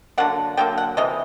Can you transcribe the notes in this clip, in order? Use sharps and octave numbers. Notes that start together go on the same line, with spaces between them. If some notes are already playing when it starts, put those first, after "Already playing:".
D3 F#3 A#3 F#5
D3 F#3 A#3 G5
F#5
C3 E3 D#5